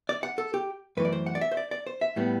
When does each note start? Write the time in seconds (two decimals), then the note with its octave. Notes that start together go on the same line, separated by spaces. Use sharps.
0.09 D5
0.23 F#5
0.38 A4
0.54 G4
0.97 F#2 E3 A3 B4
1.05 D5
1.13 C5
1.26 F#5
1.35 D5
1.41 E5
1.52 C5
1.57 D5
1.71 D5
1.87 C5
2.01 E5
2.16 A2 G3 B3